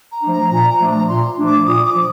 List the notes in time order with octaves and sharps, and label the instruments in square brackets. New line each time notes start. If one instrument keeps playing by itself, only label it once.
[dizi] A#5
[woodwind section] F3 A3 D4
[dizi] A#5
[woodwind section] A#2 [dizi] A#5
[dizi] A#5
[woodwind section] F3 A3 D4
[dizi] A#5
[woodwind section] A#2 [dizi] C6
[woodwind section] F3 A3 D4
[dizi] D6
[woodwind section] A#2 [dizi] D#6
[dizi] D6
[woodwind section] F3